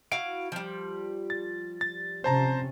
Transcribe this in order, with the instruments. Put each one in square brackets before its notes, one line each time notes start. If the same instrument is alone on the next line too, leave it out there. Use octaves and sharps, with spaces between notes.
[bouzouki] E4 F#4 F5 [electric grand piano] D7
[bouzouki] F3 G3
[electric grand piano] A6
A6
[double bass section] C3 C#4 [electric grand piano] C5 A5 A#5